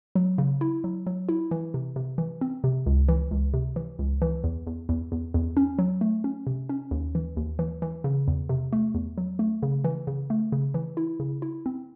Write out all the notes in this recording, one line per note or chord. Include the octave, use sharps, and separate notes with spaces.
F#3
C#3
E4
F#3
F#3
E4
E3
C3
C3
E3
C4
C3
C#2
E3
C#2
C3
E3
C#2
E3
E2
E2
E2
E2
E2
C#4
F#3
A3
C#4
C3
C#4
D#2
E3
D#2
E3
E3
C#3
E2
C3
A3
E2
F#3
A3
C#3
E3
C#3
A3
C#3
E3
E4
C#3
E4
C4